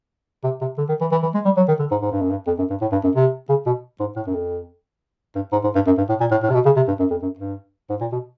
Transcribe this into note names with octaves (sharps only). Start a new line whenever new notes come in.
C3
C3
D3
D#3
E3
E3
E3
G#3
G3
F#3
D#3
D3
G#2
G#2
G2
F#2
G2
F2
F#2
G2
A2
G2
F#2
C3
C#3
B2
G#2
A2
F#2
F2
G2
G#2
G#2
G2
F#2
G2
A2
A#2
A2
A2
C3
B2
C#3
C3
G2
F#2
F2
F#2
G2
G#2
A#2
B2